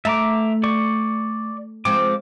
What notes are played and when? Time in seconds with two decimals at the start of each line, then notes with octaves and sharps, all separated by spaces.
0.05 A3 E5 A#5 D6
0.63 D5 C#6
1.85 F3 G#3 C4 D6